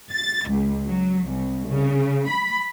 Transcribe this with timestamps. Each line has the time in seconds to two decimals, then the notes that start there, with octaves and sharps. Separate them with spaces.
0.11 A6
0.49 C#2
0.86 F#3
1.29 C2
1.69 C#3
2.30 B5